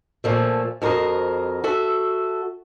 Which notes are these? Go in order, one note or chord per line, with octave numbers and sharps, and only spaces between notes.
A#2 F3 A3
F2 F#4 A#4 C5 D#5
F#4 A4 E5